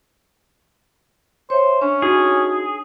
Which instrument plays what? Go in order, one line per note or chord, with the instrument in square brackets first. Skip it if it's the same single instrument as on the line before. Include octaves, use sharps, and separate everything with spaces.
[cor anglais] C5 [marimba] C#5 E5
[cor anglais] C#4 [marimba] D4
[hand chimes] D#4 F#4 [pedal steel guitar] G#4